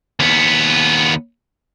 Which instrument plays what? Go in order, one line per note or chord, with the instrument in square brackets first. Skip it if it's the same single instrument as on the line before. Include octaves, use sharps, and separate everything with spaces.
[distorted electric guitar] D#2 B3